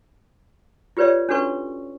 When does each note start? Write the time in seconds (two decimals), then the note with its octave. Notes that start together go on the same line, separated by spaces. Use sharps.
0.97 F4 G4 B4 C#5 D5 E5
1.29 C#4 D4 F#4 A4 B4 C#6